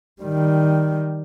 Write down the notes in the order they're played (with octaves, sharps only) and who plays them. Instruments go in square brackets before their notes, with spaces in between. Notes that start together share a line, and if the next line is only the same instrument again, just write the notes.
[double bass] D#3 G3